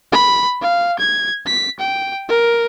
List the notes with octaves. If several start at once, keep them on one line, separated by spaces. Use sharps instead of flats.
B5
F5
G#6
B6
G5
A#4